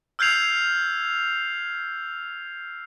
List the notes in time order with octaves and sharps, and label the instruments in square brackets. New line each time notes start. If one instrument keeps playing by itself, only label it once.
[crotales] E6 F6 G6 G#6 C7 F7